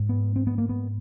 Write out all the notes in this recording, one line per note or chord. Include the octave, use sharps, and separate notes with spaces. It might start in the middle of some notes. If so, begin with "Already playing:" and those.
Already playing: G#2
B3
C4
B3
A#3
B3